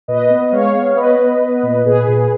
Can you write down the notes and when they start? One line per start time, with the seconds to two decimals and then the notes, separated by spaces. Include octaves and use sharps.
0.08 A#2 B4 D#5
0.30 B3
0.52 G#3 C#5 F5
0.74 B3
0.97 B3 B4 D#5
1.19 B3
1.41 B3
1.63 A#2
1.86 A#2 G#4 B4
2.08 A#2